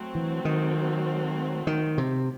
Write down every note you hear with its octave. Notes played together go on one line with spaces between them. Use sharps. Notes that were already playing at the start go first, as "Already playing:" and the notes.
Already playing: F#3 A3 C4
E3
D#3
D#3
C3